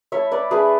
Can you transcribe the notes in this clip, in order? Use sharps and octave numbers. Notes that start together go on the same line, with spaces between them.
A3 E4 C#5 E5
B4 D5
A3 D4 G#4 B4